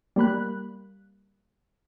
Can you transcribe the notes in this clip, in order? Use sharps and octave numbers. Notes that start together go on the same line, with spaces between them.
G3 A#3 B5 F#6